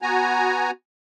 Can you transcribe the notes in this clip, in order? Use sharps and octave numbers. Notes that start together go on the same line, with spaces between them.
B3 F#4 G#5 A#5